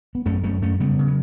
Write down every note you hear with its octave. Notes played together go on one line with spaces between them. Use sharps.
B3
F#2 A3 C#4
F#2 A3 C#4
F#2 A3 C#4
C#3 G3 B3
C#3
F#3